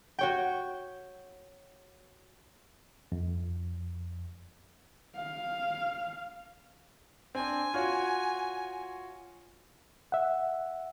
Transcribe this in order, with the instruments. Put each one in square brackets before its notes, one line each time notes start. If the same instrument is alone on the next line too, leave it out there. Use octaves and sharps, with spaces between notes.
[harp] F#4 C#5 G5
[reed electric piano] F2
[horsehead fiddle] F5
[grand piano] C4 D4 [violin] G#5
[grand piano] F4 F#4 C#5
[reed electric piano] E5 F#5